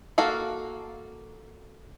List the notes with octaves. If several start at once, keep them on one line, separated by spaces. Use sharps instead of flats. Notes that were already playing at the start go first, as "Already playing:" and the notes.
A#3 F#4 A4 F5